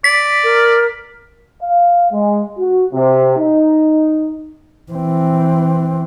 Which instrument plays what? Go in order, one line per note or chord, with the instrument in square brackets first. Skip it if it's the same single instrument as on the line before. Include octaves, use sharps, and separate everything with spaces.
[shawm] D5 [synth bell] B6
[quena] A#4
[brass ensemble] F5
G#3
F#4
C3
D#4
[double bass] E3 C4